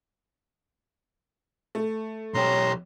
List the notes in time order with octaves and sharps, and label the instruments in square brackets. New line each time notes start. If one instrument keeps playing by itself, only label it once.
[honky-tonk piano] A3
[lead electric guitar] B1 G4 [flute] C#5 [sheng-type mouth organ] A#5 C6